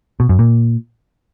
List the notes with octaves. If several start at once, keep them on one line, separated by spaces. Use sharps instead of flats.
B2
F#2
A#2